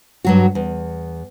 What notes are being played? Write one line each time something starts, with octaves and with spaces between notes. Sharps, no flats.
G2 F#3 F#4
E2